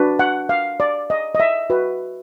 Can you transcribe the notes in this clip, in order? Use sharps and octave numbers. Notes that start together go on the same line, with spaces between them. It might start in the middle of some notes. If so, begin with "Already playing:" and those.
Already playing: D4 F#4 B4
F#5
F5
D5
D#5
D#5
E5
F#4 B4